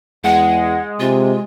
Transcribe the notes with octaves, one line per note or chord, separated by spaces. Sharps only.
E2 G#3 F#5
C3 F4